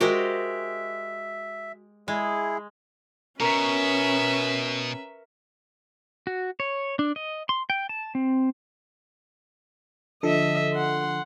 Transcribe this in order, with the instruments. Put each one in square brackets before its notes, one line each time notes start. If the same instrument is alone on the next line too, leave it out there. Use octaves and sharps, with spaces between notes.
[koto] G#3 G4 [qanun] F#4 A#4 C5 [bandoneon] E5
[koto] G#3 [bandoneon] E4 G#4
[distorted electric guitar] B2 [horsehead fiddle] C#4 [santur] A#4 C#6 [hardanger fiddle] B4 E5
[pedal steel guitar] F#4
C#5
D4
D#5
C6
G5
A5
C4
[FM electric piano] D3 F3 A4 [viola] D#5 E5
[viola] F#5 C6